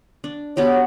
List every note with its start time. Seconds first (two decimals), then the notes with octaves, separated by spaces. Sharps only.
0.24 D4
0.57 B3 F#4 G4 C#5